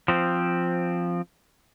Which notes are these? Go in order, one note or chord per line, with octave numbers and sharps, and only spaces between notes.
F3 C4